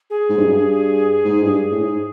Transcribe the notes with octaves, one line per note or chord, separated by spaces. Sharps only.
G#4
G#2
G2
F#2
G2
G#2
G2
A2
G#2